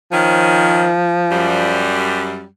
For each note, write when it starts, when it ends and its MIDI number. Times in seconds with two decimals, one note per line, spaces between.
0.12 0.90 51
0.12 1.91 53
0.12 0.90 60
0.12 0.90 61
1.30 2.45 42
1.30 2.45 55